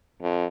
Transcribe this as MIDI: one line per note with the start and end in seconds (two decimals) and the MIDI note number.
0.22 0.45 41